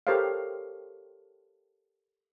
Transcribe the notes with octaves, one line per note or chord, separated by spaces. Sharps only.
G4 A4 A#4 C5 C#5 F5